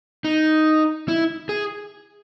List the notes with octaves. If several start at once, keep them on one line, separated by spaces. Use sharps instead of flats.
D#4
E4
G#4